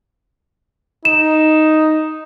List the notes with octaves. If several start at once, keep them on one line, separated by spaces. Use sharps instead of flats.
D#4 E7